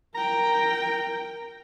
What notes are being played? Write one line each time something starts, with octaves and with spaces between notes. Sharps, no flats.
A#4 G5 A#5